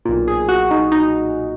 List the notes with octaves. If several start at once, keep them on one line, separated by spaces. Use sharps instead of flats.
B1 A#2
G#4
F#4
D#4
D#4